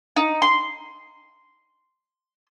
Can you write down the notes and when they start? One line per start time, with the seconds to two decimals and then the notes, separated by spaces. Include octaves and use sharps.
0.16 D#4
0.42 C6